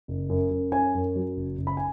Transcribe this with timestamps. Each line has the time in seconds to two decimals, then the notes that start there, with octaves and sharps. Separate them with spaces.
0.08 F#1
0.30 F#2
0.51 F#2
0.72 C#4 G#5
0.95 F#2
1.16 F#3
1.37 F#1
1.58 F#1
1.67 B5
1.77 G#5